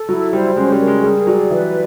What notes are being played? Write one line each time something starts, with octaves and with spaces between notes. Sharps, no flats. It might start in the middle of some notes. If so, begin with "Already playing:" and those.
Already playing: A4
F#3 E4
G3 C5
G#3 C#4
G3
A#4
G#3
G3 G#4
F#3 D5
E3 B4